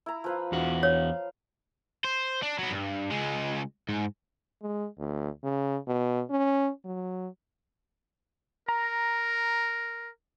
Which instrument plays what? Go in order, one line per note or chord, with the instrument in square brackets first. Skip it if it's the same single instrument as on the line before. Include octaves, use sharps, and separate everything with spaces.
[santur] E4 A#5
F3 B4 F5
[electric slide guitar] E2 F#4
[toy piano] C#5 [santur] F5
[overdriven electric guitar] C5
D4
F#3 B3
G2
C#2 G#3
G#2
[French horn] G#3
D2
C#3
B2
C#4
F#3
[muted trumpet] A#4 [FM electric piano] A#5